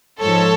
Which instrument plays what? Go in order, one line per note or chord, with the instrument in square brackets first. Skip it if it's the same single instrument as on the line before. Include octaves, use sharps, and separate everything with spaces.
[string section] G#2 F3 A4 C#5